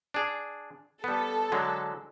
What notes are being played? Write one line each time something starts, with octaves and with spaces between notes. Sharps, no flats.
D4 G#4
G3 B3 A4
D3 F#3 G#3